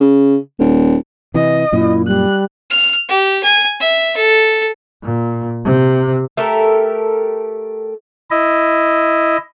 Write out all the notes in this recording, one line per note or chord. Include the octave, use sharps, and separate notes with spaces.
C#3
D#1
C3 E3 D#5
F#2 A#2 E4
G3 F#6
F6
G4
G#5
E5
A4
A#2
C3
A3 G4 A4 A#4
E4 D#5